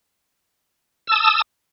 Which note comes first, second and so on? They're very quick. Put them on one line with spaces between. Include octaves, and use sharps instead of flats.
E6 A5 D#6